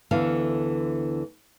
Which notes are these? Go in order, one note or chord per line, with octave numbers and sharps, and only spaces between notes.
D2 D3 E3 B3 F5